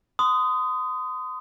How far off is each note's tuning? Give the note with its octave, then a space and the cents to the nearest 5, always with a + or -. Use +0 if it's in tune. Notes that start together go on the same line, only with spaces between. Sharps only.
C6 -35 D#6 +0